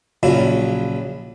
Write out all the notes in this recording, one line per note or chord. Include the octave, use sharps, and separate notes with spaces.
A#1 A#2 C#3 F#3 E4